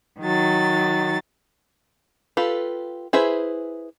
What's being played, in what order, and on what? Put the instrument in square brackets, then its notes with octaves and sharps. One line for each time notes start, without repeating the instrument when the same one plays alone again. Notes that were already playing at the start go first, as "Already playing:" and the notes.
[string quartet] D#3 F#3 A6
[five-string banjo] F4 G4 A4 B4
E4 G#4 B4 C5 E5